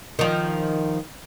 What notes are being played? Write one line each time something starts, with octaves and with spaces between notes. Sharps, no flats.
D#3 F3